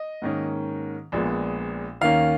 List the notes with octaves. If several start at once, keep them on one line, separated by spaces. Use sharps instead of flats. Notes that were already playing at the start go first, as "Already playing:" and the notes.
Already playing: D#5
G#2 D#3 A#3 C#4
A#1 A#2 G#3 B3
D#2 D#3 A#3 C#4 F5